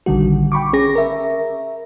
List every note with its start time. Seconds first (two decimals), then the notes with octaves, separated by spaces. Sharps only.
0.06 A#1 D3 D#3 G3 F#4
0.52 G5 B5 C#6 D6
0.73 C#4 G#4 A#6
0.95 A#4 E5